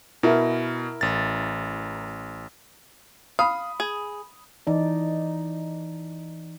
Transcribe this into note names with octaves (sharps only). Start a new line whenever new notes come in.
B2 E4 A#4 E5
A1 A6
F5 B5 D#6
G#4
E3 D#4 D5